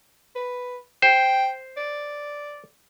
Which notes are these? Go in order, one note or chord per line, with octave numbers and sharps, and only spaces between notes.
B4
C5 G5
D5